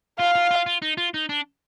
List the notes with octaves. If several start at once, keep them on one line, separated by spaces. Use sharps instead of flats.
F4 F5
F4
F4
F4
D#4
F4
D#4
D4